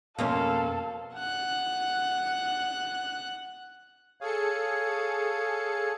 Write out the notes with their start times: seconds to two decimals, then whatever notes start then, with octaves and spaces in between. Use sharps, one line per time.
0.19 F2 B2 A#3 C#4 A4 F5
1.16 F#5 F#6
4.21 G#4 A4 C#5 F5 C#7